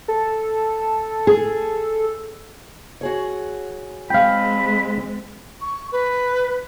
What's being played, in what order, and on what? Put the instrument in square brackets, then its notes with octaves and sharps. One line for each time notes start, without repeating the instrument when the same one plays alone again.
[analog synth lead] A4
[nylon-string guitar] G#4
[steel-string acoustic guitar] F#4 G#4 C#5
[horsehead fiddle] G#3 C4 [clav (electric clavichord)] F5 G5 [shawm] B5
[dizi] C#6
B4